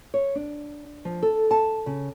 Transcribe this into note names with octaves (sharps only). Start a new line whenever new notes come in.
C#5
D4
F3
A4
A5
C#3